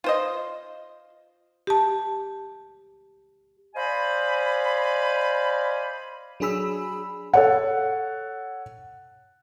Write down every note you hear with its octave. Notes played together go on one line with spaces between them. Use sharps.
F4 C5 D#5
G4 A5
C5 D5 D#5 F5 G#5 B5
F#3 D4 G#4 B5 E6
A4 C#5 F#5